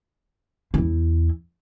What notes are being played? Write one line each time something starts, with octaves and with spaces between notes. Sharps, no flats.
E2 E4